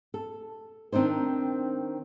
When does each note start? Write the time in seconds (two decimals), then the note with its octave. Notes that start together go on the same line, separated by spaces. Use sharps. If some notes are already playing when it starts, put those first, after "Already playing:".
0.14 A4
0.92 D#3 C4 D4 D#4 C5